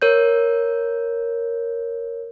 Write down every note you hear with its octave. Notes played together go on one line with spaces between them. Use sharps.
A#4 C#5 G6